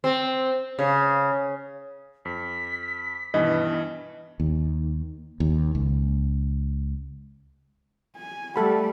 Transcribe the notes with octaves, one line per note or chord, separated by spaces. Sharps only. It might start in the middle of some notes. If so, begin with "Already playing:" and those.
C4
C#3
F2 B6
G2 B2 D#3 E3 D#5
D#2
D#2
C#2
G#5
G3 A3 A4 F#5 B5